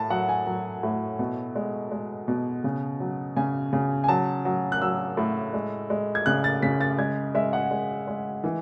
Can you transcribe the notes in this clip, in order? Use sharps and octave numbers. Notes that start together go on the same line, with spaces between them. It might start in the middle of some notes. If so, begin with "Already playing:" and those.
Already playing: A2 A5
F#3 F#5
G#5
F#3
A2
B2
G#3
G#3
B2
C#3
F#3
C#3 G#5
C#3
G#5
F#3 A5
F#3
F#6
F#3 E6
A2
G#3
G#3
G#6
C#3 F#6
A6
C#3 B6
A6
G#3 G#6
G#3 E5
F#5
G#3
G#3
E3